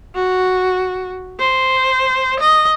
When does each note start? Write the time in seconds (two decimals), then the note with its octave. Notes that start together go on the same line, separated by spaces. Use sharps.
0.15 F#4
1.39 C5
2.40 D#5